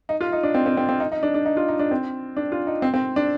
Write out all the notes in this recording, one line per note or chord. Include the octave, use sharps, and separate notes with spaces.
D#4
F4
D#4
D4
C4
C4
C4
C4
D#4
D#4
D4
D4
D#4
F4
D#4
D4
C4
D4
F4
D#4
C4
C4
D4